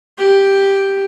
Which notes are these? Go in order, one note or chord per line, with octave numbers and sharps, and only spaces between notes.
G4